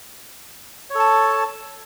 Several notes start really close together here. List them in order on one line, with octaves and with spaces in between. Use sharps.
C#5 A4 A5